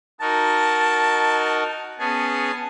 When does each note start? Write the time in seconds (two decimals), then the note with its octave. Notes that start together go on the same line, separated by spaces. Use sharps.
0.21 D#4 F#4 A#4 A5
1.99 B3 C#4 G#4 A5